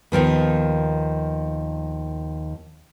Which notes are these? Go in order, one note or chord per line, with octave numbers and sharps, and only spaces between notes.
D#2 D#3 F3 B3